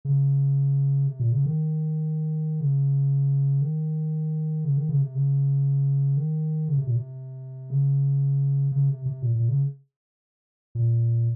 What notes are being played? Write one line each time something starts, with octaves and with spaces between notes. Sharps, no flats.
C#3
C3
A#2
C#3
D#3
C#3
D#3
C#3
D#3
C#3
C3
C#3
D#3
C#3
C3
A#2
C3
C#3
C#3
C3
C3
A#2
A#2
C#3
A#2